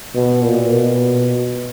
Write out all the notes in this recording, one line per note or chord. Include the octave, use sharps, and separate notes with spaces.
B2
A#2
B2